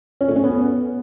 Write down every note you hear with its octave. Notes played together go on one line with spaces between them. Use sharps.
C#4
A3
C#4
B3